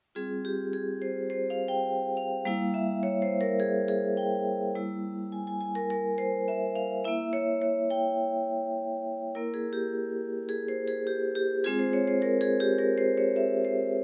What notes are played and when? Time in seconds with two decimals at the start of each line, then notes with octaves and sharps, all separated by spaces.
0.15 G3 C4 F4 G#4
0.45 G4
0.73 G#4
1.02 C5
1.30 C5
1.50 F5
1.68 G5
2.17 F5
2.45 G3 A#3 E4 F5
2.74 E5
3.03 C#5
3.22 C5
3.41 A#4
3.60 G#4
3.88 G#4
4.17 G5
4.75 G3 A#3 E4
5.32 G#5
5.47 G#5
5.61 G#5
5.75 A#4
5.90 A#4
6.18 C5
6.48 E5
6.75 F5
7.04 A#3 E4 E5
7.33 C#5
7.62 C#5
7.90 G5
9.35 A#3 E4 A#4
9.54 G#4
9.73 G4
10.49 G#4
10.68 C5
10.87 G#4
11.07 G4
11.35 G4
11.64 G#3 C4 F4 G#4
11.79 C5
11.93 C#5
12.07 C5
12.22 A#4
12.41 G#4
12.60 G4
12.78 A#4
12.98 C5
13.17 C#5
13.36 E5
13.65 C5